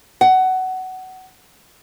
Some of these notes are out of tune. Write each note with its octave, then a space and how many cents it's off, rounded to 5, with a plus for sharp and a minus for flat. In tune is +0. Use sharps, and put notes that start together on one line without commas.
F#5 +15